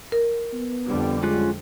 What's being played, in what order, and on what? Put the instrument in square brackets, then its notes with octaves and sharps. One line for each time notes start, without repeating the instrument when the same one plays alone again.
[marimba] A#4
[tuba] B3
[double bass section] F2 D3 G3
[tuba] G#3 [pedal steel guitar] C#4 F4 F#6